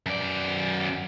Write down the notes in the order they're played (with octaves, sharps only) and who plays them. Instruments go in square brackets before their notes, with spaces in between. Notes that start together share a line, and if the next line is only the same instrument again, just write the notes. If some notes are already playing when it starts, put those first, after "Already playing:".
[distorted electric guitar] F#2 D5